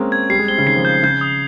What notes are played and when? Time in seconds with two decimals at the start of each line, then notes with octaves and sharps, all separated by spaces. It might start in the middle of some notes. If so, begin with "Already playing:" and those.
Already playing: G#3 A#3 C4 C#4
0.12 G#6
0.30 G3 C7
0.39 G#3
0.48 C4 G7
0.58 C#3
0.66 D#3 C7
0.76 F3
0.85 G6
1.03 C#3 G6
1.21 D#6